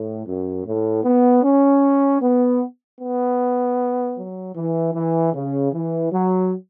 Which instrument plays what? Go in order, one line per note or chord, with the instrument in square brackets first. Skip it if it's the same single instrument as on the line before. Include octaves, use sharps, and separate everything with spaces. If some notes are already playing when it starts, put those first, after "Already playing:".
Already playing: [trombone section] A2
F#2
A2
B3
C#4
B3
B3
F#3
E3
E3
C#3
E3
F#3